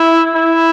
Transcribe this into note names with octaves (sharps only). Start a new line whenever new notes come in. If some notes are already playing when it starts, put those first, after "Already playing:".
Already playing: E4
E4